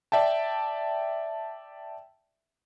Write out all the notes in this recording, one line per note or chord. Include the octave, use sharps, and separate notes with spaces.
D5 E5 G5 A5